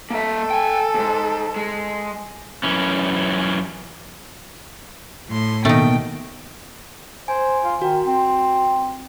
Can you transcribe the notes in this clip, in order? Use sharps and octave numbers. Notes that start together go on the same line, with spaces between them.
A#3 A4 E5
G5 G#5
D#2 G#2
G#3
F#2 E3 C#4
A2 C6
D#2 B2 D#3 A3 D#4 G5
C5 G#5
F4
D#3 F#4
C4